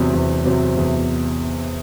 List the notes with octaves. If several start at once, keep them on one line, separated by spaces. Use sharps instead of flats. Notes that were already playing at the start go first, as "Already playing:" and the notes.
Already playing: E2 C3 F#3 C4
E2
C3 F#3 C4
E2